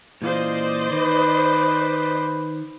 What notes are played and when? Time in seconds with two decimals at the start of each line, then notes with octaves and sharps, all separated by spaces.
0.22 A#2 E3 F4 C5 D5 D#5
0.91 D#3 B4